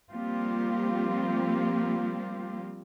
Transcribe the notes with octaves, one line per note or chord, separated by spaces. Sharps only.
F3 G3 A#3 C4 F4 G4